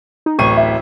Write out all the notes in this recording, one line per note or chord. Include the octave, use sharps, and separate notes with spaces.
D#4
D1 A1 C#6 D#7
E5